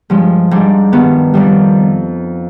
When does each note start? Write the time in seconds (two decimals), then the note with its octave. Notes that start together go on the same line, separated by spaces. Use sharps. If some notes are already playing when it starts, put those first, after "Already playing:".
0.10 G2 F3 G#3
0.51 G#2 G3 D4 G4
0.92 G2 D#3 B3
1.34 F2 D#3 G3